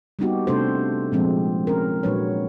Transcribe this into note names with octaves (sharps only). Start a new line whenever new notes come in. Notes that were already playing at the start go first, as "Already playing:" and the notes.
G3 A#3 B3 D#4 F#4 G4
C3 A3 D4 A4 C5
A#2 D3 F3 G#3 C4
C#4 A#4
A#2 F#3 G#3 D4 B4 C#5